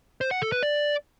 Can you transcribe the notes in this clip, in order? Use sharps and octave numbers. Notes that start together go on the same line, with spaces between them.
C5
F#5
A4
B4
D5